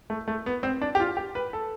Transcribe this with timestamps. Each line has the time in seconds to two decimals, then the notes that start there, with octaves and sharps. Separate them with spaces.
0.10 A3
0.28 A3
0.46 B3
0.63 C4
0.82 D4
0.95 G4
1.00 F4
1.17 G4
1.35 B4
1.53 A4